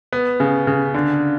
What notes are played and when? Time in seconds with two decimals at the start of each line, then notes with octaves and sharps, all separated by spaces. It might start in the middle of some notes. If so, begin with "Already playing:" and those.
0.13 B3
0.40 C#3
0.67 C#3
0.94 D3